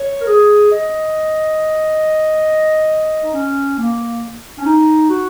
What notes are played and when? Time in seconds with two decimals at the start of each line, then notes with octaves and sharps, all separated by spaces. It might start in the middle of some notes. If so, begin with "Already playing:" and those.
Already playing: C#5
0.21 A#4
0.27 G#4
0.71 D#5
3.23 D#4
3.33 C#4
3.78 A#3
4.59 C#4
4.65 D#4
5.09 F#4